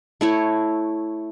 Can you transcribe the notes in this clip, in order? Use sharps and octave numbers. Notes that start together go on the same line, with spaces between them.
A3 E4 C#5